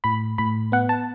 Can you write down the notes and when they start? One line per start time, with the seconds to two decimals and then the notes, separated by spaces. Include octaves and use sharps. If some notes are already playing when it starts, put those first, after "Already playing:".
0.04 A2 B5
0.38 A2 B5
0.72 B3 F#5
0.89 A5